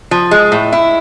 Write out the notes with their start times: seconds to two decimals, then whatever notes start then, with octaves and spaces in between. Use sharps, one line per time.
0.11 F3
0.31 G#3
0.52 A2
0.72 E4